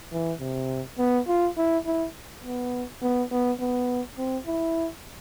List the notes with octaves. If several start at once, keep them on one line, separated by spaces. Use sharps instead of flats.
E3
C3
B3
F4
E4
E4
B3
B3
B3
B3
C4
E4